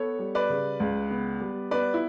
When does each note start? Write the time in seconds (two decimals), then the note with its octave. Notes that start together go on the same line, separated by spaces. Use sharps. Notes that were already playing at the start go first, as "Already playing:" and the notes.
Already playing: B3 A4 C#5
0.19 G3
0.35 B4 D5
0.50 C#3
0.80 C#2
1.10 B3
1.41 G3
1.71 B3 B4 D5
1.94 E4